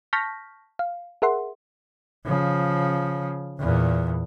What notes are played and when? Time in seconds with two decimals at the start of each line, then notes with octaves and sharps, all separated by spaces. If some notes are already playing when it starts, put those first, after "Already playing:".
0.13 A5 C#6 F6 G6 A#6 B6
0.79 F5
1.22 G#4 A#4 E5 F#5 C6
2.26 C#3 F3
3.59 E2 A#2